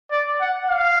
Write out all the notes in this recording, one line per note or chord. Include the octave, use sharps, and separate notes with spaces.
D5
F#5
F5